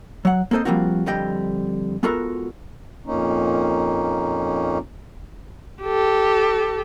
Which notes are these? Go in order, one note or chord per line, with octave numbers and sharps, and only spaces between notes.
F#3 F#5
A#3 C4 A4 C5 D#5
F3 G3 A#3 C4 F4 F#4
F2 D3 G3 D#5 G5
G#3 B3 F4 F#4 A4 A#4
F2 A#2 A#3 C#4 D#4
G4 A4